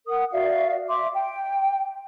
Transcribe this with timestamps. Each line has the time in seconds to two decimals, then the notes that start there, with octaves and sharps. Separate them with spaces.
0.07 A#4 F#5 D#6
0.32 F#4 D5 E5 F5
0.88 E5 C6 D6
1.14 G5